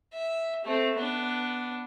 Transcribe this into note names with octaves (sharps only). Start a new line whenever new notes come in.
E5
A3 C4
B3 D4